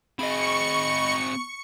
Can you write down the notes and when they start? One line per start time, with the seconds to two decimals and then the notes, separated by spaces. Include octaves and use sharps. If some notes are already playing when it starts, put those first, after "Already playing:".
0.19 C4 G#4 D#5 B5 C#6 C#7